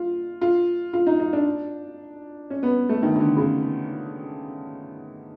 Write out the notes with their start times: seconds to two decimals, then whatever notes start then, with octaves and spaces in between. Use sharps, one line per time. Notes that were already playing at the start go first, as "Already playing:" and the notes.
Already playing: F4
0.41 F4
0.93 F4
1.07 D#4
1.20 D#4
1.33 D4
2.50 C#4
2.63 B3
2.89 A3
3.02 D#3
3.15 D#3
3.20 D3
3.37 C#3